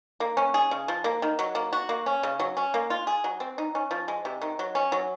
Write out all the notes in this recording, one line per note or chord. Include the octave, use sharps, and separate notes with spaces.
A#3
C#4
G#4
C#3
F3
A#3
D#3
F#3
A#3
F#4
A#3
C#4
C#3
F#3
C#4
A#3
F4
G#4
F#3
C4
D#4
C#4
F3
G#3
C3
D#3
F#3
C#4
F#3